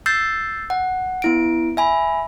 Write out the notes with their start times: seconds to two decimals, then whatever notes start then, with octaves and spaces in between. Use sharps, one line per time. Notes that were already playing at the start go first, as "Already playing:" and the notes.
0.06 E6 G6 A6 C7
0.70 F#5
1.22 B3 E4 D7
1.77 E5 G#5 B5